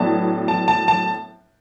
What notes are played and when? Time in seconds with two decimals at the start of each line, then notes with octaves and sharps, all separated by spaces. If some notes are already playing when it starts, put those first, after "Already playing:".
Already playing: A2 F#3 B3 D4 A5
0.48 A5
0.68 A5
0.88 A5